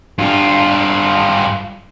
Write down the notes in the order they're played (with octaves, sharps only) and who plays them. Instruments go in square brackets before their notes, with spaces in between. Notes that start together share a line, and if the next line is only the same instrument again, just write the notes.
[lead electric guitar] G2 F4